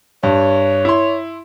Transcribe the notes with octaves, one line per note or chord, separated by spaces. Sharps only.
G2 C#5
E4 C6